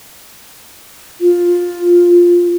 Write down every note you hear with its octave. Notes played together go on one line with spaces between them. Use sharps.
F4